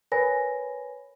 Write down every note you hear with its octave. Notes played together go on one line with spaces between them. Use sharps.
A#4 B4 C#5 G#5 B5 A#6